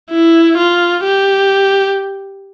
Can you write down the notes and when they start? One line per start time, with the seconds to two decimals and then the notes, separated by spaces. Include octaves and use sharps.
0.10 E4
0.57 F4
1.04 G4